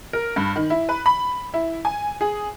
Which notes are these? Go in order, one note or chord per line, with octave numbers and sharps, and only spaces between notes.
A#4
G2
D#3
E4
B4
B5
E4
G#5
G#4